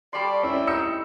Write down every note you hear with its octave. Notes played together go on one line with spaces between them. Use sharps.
G3 A4 C#5 D5 C6
A2 C4 C#4 E4
D#4 E6 C#7